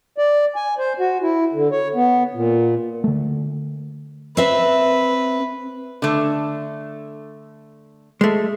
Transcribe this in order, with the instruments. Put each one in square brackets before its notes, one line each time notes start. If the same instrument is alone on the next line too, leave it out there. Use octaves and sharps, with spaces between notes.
[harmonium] D5
G#5
C5
F#4
E4
D3
C#5
B3
A#2
[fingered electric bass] D3 A3
[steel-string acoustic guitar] C4 E5 [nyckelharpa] B4
[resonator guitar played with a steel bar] D3 A3
[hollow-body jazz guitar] G#3 A3